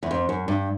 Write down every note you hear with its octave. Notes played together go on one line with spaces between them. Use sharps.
E2
F2
F#2
G2